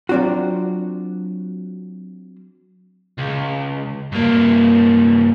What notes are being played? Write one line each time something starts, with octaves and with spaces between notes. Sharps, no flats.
F#3 C4 D4 F4 F#4
C#2
G2 A#3